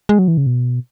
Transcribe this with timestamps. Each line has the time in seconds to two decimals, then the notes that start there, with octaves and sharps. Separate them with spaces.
0.09 G#3
0.19 F#3
0.28 E3
0.38 C#3
0.47 B2